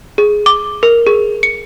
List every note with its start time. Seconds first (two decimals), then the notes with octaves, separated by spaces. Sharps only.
0.18 G#4
0.46 D6
0.83 A#4
1.07 G#4
1.43 C#7